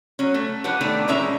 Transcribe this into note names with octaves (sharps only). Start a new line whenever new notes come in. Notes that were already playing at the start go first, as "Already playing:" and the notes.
F#3 C#4
A3
F3 G3 D4 B4 F#5
D#3 A3 B3 D4
A#2 E3 G#3 C#4 E5 A#5